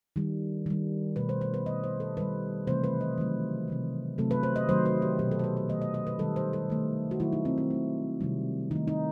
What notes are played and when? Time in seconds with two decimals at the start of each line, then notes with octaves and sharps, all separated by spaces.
0.16 D#3 G3
0.66 D#3 G3
1.16 B2 A3 B4
1.29 C5
1.41 C5
1.54 B4
1.66 D#3 A3 D#5
1.84 C5
2.00 A4
2.17 D#3 G3 B4
2.67 C3 E3 A3 C5
2.84 B4
3.01 D#5
3.18 D#3 F#3 A3
3.68 C3 E3 A3
4.18 C3 F#3 A3 A4
4.31 B4
4.43 C5
4.56 D#5
4.69 D#3 F#3 A3 C5
4.86 B4
5.02 G4
5.19 B2 F#3 A3 G4
5.31 A4
5.39 C5
5.44 B4
5.57 C5
5.69 D#3 F#3 A3 D#5
5.82 D#5
5.94 D#5
6.07 B4
6.19 D#3 G3 A4
6.36 C5
6.53 A4
6.70 D#3 A3
7.11 F#4
7.20 D#3 F#3 A3 E4
7.33 D#4
7.45 C4
7.58 C4
7.70 D#3 A3
8.21 C3 D#3 G3
8.71 D#3 A3 D#4
8.88 D#4